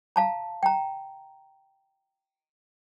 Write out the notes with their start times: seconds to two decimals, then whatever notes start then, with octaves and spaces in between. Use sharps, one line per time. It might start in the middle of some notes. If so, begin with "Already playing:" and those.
0.16 F5 A5 A#5
0.63 G5 A#5